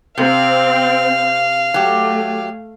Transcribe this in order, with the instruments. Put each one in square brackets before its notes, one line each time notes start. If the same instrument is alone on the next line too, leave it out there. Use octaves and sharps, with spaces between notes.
[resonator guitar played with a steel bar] C3 [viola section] C4 [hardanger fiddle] F5
[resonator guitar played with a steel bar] F#3 G4 [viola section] A3